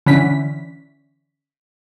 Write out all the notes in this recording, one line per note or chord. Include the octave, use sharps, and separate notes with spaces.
D3 E3 C#4 B6